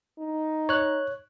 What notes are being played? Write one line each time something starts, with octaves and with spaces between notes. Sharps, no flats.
D#4
C#5 F#6